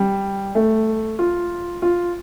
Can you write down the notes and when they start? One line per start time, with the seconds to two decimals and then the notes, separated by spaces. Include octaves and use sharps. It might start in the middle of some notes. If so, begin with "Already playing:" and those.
Already playing: G3
0.55 A3
1.19 F4
1.82 F4